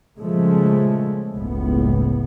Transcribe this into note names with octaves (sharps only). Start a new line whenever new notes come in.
A#2 C#3 F3 G#3 A3
F#1 C#2 A2 B3